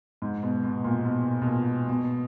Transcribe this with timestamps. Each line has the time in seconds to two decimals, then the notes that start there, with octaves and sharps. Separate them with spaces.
0.22 G#2
0.43 B2
0.63 B2
0.84 A#2
1.05 B2
1.42 B2
1.47 A#2
1.89 B2